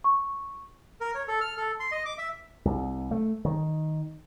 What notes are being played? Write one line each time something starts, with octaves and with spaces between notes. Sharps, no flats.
C#6
A#4
C#5
A4
F6
A4
C6
D#5
D6
E5
C2
A3
D#3